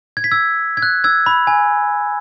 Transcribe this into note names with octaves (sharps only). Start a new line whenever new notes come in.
G#6
B6
E6 G#6
G#6
F#6
E6 G#6
B5
G#5